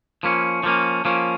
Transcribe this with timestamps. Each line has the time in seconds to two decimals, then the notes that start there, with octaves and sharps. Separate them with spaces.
0.23 F3 A#3 C#4
0.63 F3 A#3 C#4
1.05 F3 A#3 C#4